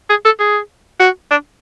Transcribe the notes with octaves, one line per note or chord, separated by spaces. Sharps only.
G#4
A4
G#4
F#4
D4